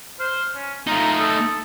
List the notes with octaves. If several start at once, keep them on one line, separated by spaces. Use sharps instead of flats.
C5 F6
C#4
A3 D#4 F4 A#5
A4 D#6